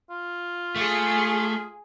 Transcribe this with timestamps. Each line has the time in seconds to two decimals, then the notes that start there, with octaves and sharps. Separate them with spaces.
0.10 F4
0.76 A3 G#4